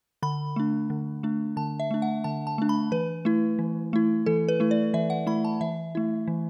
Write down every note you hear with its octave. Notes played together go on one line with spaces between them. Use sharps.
D3 B5
A3 D4
D3
A3 D4
D3 A5
E5
A3 D4
F#5
D3 A5
A5
A3 D4
B5
E3 B4
A3 E4
E3
A3 E4
E3 A4
B4
A3 E4
D5
E3 E5
F#5
A3 E4 B5
A5
E3 E5
A3 E4
E3